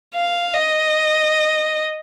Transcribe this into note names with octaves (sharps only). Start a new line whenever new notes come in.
F5
D#5